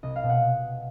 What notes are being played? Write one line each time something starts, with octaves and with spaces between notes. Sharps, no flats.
C2 D#5
F5
B2
F#5